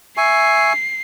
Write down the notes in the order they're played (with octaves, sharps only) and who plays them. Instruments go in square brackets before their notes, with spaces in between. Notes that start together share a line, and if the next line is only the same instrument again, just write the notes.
[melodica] E5 G#5 C#6 [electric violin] C7